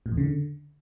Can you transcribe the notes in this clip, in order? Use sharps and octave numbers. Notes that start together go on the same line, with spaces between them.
A2
E2
C#3
D3